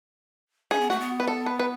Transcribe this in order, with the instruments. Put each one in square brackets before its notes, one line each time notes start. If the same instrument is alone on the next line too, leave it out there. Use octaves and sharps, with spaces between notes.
[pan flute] C#4 [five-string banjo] G#4
[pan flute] B3
[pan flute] A3 [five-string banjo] F#4
[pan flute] B3
[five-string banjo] B4
A4
B4
B4